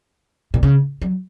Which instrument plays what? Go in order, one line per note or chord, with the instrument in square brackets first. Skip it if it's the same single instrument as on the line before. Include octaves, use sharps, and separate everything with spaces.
[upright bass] A#2
C#3
F#3